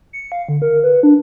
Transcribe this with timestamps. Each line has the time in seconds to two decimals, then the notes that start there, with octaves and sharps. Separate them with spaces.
0.13 C#7
0.32 F5
0.49 D3
0.62 A#4
0.84 B4
1.03 D4